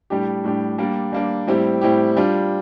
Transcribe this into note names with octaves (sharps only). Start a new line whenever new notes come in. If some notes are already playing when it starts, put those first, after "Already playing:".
A2 G3 D4 G4
A2 G3 D4 G4
G3 A#3 D4
G3 A#3 D4
A2 G3 C4 E4 G4
A2 G3 C4 E4 G4
G3 D4 F4